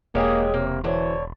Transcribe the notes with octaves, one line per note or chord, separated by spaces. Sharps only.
E1 G#3 A#3 G4 G#4 C#5 F5
C3 A#3
F#2 D3 E3 C5 C#5